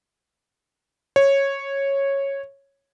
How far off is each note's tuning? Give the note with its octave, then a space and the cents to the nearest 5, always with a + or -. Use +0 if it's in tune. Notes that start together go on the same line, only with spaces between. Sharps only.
C#5 -10